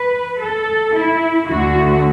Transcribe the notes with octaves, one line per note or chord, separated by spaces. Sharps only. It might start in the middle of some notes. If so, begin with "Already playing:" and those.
Already playing: B4
A4
E4
D2 D3 A3 F#4